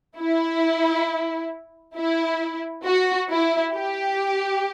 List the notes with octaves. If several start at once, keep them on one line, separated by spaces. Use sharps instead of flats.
E4
E4
F#4
E4
G4